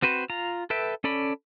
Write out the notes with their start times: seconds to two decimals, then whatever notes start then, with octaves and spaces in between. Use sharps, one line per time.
0.02 C4 F#4 B4 C5
0.30 F4 A#5
0.70 A4 B4 E5 G5
1.04 C#4 A4 D5 B5